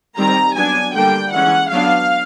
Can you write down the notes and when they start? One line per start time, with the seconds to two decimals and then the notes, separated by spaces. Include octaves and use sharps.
0.18 D#3 G3 C4 A#5
0.56 F#3 B3 D4 G#5
0.94 D3 G3 A#3 D4 G5
1.33 E3 G#3 C#4 F#5
1.71 F#3 B3 D4 F5